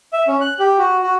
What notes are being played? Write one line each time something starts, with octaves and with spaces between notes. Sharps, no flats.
E5
C#4
F#6
G4
F#4
F#4